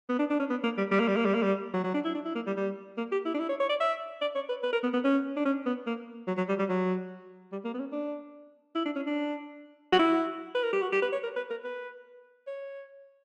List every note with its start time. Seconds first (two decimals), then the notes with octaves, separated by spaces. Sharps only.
0.09 B3
0.19 D4
0.30 D4
0.40 C#4
0.50 B3
0.64 A#3
0.78 G3
0.92 G3
1.00 A#3
1.08 G3
1.16 A#3
1.26 G3
1.35 A#3
1.43 G3
1.74 F#3
1.84 F#3
1.94 D4
2.05 E4
2.15 D4
2.25 E4
2.35 A#3
2.47 G3
2.57 G3
2.98 A#3
3.12 G4
3.25 E4
3.34 D4
3.40 E4
3.49 C#5
3.60 C#5
3.70 D5
3.81 E5
4.21 D5
4.35 C#5
4.49 B4
4.63 B4
4.73 A#4
4.83 B3
4.94 B3
5.04 C#4
5.36 D4
5.45 C#4
5.66 B3
5.87 A#3
6.28 F#3
6.38 F#3
6.49 G3
6.59 G3
6.69 F#3
7.52 G3
7.65 A#3
7.74 B3
7.79 C#4
7.92 D4
8.75 E4
8.85 D4
8.96 C#4
9.07 D4
9.93 F#4
9.99 E4
10.55 B4
10.64 A#4
10.73 G4
10.82 F#4
10.92 G4
11.02 B4
11.12 C#5
11.23 A#4
11.36 B4
11.51 A#4
11.64 B4
12.47 C#5